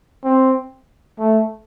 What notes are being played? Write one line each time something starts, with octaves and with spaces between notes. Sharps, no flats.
C4
A3